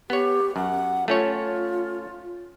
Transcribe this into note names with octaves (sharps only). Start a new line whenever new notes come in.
B3 G4 C#5
F#2 F#5
A3 C#4 F4 C#5